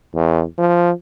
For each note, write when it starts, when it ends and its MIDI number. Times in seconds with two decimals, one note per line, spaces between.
0.14 0.44 40
0.58 0.91 53